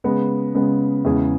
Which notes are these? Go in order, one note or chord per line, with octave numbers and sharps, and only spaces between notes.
C#3 G#3 B3
C#3 G#3 B3
E2 C#3 G#3 E4 G#4